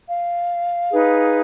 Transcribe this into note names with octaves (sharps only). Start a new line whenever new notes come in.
F5
D#4 G#4 B4